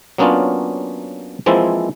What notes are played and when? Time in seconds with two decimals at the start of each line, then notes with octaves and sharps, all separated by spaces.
0.18 F#3 A#3 B3 C#4 D4 F4
1.46 E3 F3 G#3 A#3 C4 E4